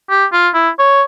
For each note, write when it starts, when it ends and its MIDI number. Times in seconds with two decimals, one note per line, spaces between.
0.10 0.25 67
0.33 0.49 65
0.54 0.69 64
0.79 1.03 73